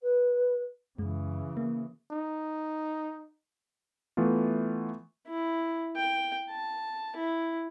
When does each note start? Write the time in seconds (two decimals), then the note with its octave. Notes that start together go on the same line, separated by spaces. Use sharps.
0.01 B4
0.99 F#2 C#3 E3 G#3
1.57 A#3
2.11 D#4
4.17 E3 A3 B3 F4
5.27 E4
5.96 G5
6.50 A5
7.16 E4